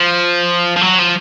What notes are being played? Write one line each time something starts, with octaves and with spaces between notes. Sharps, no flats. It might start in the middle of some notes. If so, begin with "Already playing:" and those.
Already playing: F3
F3
F#3
F3